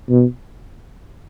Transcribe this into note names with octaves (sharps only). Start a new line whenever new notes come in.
B2